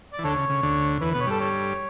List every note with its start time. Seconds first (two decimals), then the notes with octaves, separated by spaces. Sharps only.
0.13 D5
0.19 E3
0.24 D2 D3 A4 C#5
0.37 C#3
0.49 C#3
0.63 D2 D3
1.01 E2 E3 B4
1.11 B2 B3 B4
1.21 C#5
1.27 G2 G3 A4
1.40 A4 C#5